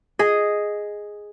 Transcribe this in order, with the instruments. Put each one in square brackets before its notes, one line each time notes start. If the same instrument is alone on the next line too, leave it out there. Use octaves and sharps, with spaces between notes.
[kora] G#4 D#5